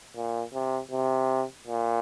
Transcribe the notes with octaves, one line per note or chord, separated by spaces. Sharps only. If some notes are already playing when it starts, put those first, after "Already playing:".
A#2
C3
C3
A#2